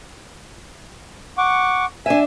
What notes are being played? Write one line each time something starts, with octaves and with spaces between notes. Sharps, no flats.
F#5 C#6 D6
D4 E5 G#5